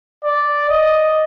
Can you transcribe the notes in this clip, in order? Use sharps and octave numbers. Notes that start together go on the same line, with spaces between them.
D5
D#5